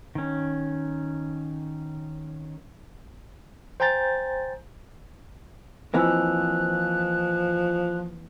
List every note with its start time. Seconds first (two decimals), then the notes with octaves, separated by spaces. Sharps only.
0.15 D#3 C#4
3.80 C5 G5 G#5 A#5 G6 A6
5.94 E3 F3 A#3 C4 D#5 G#5 E6 F#6